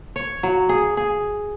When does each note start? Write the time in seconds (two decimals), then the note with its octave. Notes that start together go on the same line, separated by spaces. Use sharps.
0.16 C#5
0.43 F#3
0.69 G#4
0.97 G#4